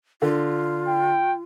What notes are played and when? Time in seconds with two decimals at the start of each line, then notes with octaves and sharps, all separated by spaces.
0.22 D3 F4
0.87 G5